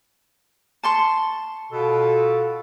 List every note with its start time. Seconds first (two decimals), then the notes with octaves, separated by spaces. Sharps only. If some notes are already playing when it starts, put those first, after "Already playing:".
0.83 A5 C6 C#6
1.72 B2 F4 A4